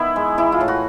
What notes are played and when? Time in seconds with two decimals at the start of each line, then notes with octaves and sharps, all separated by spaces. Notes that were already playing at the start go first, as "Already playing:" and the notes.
Already playing: D#3 B3 E4
0.16 G#3
0.38 E3 E4
0.52 F4
0.61 A2
0.68 F#4